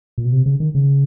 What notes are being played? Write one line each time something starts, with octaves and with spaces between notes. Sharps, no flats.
A#2
B2
C3
C#3
D#3
C#3